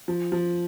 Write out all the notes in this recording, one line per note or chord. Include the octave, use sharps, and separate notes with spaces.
F3
F3